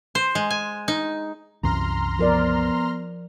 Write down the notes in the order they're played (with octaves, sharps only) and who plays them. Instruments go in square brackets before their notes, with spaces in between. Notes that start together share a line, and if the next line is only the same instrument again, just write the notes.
[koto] C5
G#3
G#5
D#4
[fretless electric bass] C2 F#2 E3 [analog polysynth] A#5 C6 F6
[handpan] F3 A#4 D5 [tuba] B3